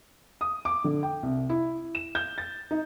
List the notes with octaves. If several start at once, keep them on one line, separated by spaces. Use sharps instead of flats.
D#6
D6
D3
G5
C2
E4
E7
G6
A6
D#4